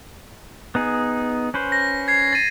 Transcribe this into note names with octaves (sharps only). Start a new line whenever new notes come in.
B3 D#4 G#4
C#4 B4 C5
A#6
G#6 C7
A6 D#7